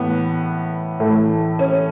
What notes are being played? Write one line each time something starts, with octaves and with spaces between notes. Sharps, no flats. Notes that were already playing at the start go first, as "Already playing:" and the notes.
Already playing: A2 E3 B3
A2 E3 A3
C#4